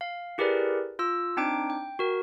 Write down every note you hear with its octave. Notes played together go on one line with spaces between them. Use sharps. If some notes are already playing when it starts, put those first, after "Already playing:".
F5
E4 G4 G#4 A#4 B4 D5
F4 E6
C4 D4 D#4 G5 D6 D7
G5
F#4 A#4